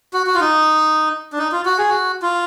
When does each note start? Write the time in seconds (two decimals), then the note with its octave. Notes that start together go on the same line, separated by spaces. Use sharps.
0.13 F#4
0.27 F#4
0.35 F4
0.41 D#4
1.33 D4
1.38 D#4
1.52 F4
1.65 F#4
1.78 G#4
1.89 F#4
2.22 F4